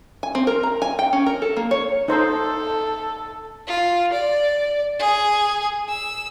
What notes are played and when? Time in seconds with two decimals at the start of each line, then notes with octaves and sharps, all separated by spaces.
0.23 G#5
0.35 C4
0.47 A#4
0.63 A#5
0.82 G#5
0.99 G5
1.13 C#4
1.26 A#4
1.42 A4
1.57 A#3
1.71 C#5
2.08 D#4 A4 C5
3.67 F4
4.13 D5
4.99 G#4
5.89 E6